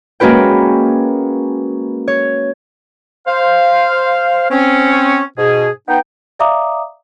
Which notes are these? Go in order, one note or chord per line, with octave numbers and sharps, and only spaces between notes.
G#3 A#3 C#4 F#4 B4 G5
C#5
C5 F5
C4 C#4
G#2 B2 G#4
B3 D#4 G5
D5 E5 F5 A#5 D6 D#6